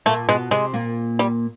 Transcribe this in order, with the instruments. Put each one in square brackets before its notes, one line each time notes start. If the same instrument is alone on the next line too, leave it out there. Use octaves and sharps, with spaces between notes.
[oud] A#2 A#3 [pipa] A3
[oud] B2 B3 [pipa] G#3
[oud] C3 C4 [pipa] G#3
[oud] A#2 A#3
[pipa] G3